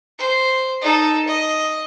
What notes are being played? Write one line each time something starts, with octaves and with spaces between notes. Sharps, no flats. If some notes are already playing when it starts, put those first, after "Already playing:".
C5
D#4 A4
D#5